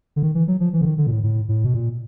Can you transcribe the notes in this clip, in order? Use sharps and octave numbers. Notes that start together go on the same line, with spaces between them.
D3
D#3
E3
F#3
F3
E3
D3
D#3
D3
A#2
A2
A2
A2
B2
A#2